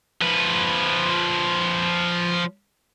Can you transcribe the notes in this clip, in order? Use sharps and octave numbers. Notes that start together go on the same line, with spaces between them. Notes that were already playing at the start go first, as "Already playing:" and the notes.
F3 B4